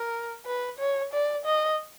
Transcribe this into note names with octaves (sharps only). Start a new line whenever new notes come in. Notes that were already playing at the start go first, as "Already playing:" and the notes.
Already playing: A#4
B4
C#5
D5
D#5